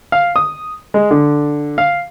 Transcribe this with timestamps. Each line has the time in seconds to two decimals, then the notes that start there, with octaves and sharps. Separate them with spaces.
0.12 F5
0.36 D#6
0.94 G#3
1.11 D3
1.78 F5